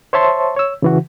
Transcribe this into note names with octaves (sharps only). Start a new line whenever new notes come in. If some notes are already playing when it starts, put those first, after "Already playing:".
C5 C#5 E5 A5 C6 C#6
C#5 E6
C#3 E3 F#4